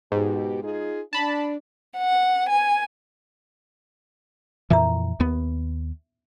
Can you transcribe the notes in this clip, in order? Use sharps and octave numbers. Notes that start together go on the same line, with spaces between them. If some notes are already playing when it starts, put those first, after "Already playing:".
G#2 B2 G4
D#4 F4 G#4
D4 A5 B5
F#5
G#5
F2 A#2 E3 E5 A#5
D#2 B3